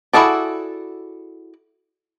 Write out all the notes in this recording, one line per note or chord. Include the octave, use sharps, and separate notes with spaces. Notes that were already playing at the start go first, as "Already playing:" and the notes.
E4 F#4 G#4 A4 D5